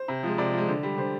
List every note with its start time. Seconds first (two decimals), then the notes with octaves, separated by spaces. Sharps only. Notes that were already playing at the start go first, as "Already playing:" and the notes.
Already playing: C5
0.08 C3
0.23 F3 G#3
0.38 C3 D5
0.53 F3 G#3
0.68 D3
0.83 G3
0.98 D3 C5